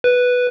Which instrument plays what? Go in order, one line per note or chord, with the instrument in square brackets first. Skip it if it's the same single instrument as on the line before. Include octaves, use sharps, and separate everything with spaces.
[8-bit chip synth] B4